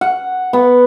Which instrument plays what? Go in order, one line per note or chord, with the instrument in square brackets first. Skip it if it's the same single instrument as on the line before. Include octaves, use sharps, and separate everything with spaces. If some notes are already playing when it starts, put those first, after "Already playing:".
[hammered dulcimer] F#5
B3